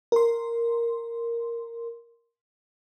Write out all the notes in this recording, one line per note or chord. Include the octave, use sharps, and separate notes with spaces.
A#4 C6